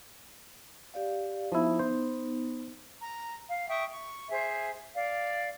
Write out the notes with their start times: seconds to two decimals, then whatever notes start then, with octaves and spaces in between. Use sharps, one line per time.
0.94 G4 D5 F5
1.52 F3 B3 D#4 E4
1.79 C5
3.02 A#5
3.48 F5
3.68 E5 G5 C#6 D#6
3.91 C#6
4.31 G#4 C5 E5
4.96 D5 F5